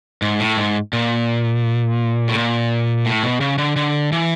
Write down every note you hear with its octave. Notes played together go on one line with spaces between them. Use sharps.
G#2
A2
G#2
A#2
A2
A#2
A2
B2
C#3
D3
D3
E3